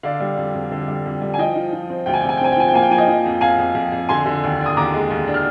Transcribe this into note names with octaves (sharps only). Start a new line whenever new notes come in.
D3 D5 F5
G3
F2
F2
D3
G3
F2
G3
G#5
F3 D#5 G5
F3
F3
C4
D2 G5
G#5
C3 G5
G#5
G5
C4 G#5
G5
F3 G#5
G5
A#3 G#5
G5
F3 G#5
D#5 G5
F3
F2
F2 F5 G#5
F2
F2
F2
D3 G#5 C6
D3
D#2
D4
D#6
D#2 A#5 D6
G#3
D#2
D4
F6